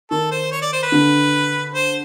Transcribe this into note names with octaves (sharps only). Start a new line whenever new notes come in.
D#3 A4
C5
C#5
D5
C5
B4
D3
C5